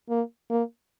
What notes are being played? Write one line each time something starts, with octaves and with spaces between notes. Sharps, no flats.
A#3
A#3